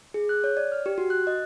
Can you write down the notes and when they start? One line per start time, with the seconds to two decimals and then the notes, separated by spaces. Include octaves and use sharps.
0.14 G#4
0.29 F#6
0.44 C#5
0.57 D5
0.72 F6
0.86 G4
0.98 F#4
1.10 F#6
1.27 D#5